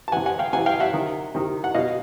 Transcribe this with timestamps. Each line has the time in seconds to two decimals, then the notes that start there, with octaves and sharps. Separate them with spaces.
0.08 A5
0.12 C3 E3 F#5 G#5
0.26 F#5 G#5
0.39 F5 G5
0.53 C3 E3 F#5 G#5
0.66 F5 G5
0.80 E5 F#5
0.94 C3 D#3
1.35 C3 D#3
1.64 F#5
1.74 B2 D#5 F5